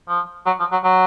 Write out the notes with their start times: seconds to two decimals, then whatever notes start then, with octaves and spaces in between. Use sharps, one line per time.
0.08 F3
0.46 F#3
0.59 F3
0.72 F#3
0.84 F#3